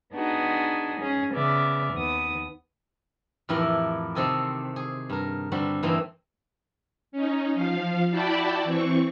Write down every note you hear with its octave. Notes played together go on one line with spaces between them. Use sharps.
B3 D4 D#4 F#4 G#4
C#4 G#4
C#3 B3 D5 E5 F6
D#2 B3 D#6
F2 A2 E3 E4 G4 A#4
C3 D#3 C4 A4 D#5 G#5
G#4
G2 A#4
G2 D3 G3 C4 F#4
G2 E3 A#3 C4 D#4 E4
C#4 D#4
F3 F5
E4 F#4 D5 G5 A5 B5
E3 C4 C#6